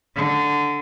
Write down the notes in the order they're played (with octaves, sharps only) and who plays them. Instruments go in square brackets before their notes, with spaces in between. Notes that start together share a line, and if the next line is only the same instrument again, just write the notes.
[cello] D3